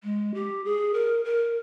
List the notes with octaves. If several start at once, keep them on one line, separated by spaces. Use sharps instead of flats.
G#3
G4
G#4
A#4
A#4